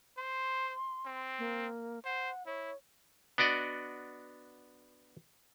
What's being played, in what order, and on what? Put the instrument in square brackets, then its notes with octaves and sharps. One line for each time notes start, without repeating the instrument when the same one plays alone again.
[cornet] C5 [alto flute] C6
[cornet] C4
[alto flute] A#3
[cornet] C5 [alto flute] F#5
[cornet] E4 [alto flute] C#5
[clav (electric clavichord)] B3 D4 F#4 D5 D#5